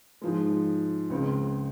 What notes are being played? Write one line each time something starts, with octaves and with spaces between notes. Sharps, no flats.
G#2 F3 G#3
C#2 C#3 G#3 C4